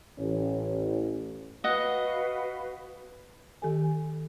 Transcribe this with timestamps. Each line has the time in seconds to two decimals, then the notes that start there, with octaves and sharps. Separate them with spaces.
0.19 A1 C#4
1.64 F#4 B4 D#5 F5 F#5
3.62 D#3 G4 A4 G#5